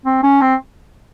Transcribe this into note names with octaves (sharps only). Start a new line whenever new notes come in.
C4
C#4
C4